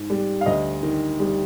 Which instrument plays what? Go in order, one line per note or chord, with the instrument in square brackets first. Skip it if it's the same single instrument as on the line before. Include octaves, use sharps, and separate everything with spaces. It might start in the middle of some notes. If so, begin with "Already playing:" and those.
Already playing: [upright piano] G#2
G3
F5
D2 D#5
D#3
G3